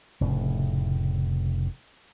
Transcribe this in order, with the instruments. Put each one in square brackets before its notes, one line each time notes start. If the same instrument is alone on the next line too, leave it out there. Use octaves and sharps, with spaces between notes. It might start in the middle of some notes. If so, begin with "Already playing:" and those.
[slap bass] F1 A2 C#3